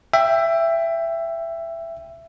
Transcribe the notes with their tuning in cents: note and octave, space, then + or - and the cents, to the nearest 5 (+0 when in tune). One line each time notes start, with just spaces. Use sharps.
E5 +15 G5 +10